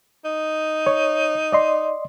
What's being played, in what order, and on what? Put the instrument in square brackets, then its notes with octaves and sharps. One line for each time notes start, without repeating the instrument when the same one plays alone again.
[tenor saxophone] D#4
[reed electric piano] C#5
D5 D#5 C6